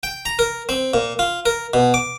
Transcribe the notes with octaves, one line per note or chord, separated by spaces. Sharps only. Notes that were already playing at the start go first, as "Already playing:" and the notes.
G5
A#5
A#4
C4
A#2
F4
A#4
B2
D6